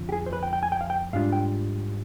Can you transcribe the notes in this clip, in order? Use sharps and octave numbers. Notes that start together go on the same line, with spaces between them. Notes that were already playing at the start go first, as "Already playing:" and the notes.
Already playing: F2 D3 F3 C4 F4
G4
G#4
C5
B4
G5
G5
G#5
G5
F5
G5
G#2 G3 D4 F4 F5
G5